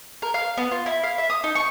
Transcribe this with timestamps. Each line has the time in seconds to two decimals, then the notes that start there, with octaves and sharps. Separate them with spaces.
0.22 A#4
0.34 F5
0.57 B3
0.71 F4
0.86 E4
1.03 F5
1.18 E5
1.30 D#6
1.44 D#4
1.55 C#6